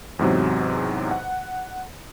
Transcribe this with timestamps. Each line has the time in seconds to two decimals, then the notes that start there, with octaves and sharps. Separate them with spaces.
0.19 E2 G#2 C3 F#3
1.11 F#5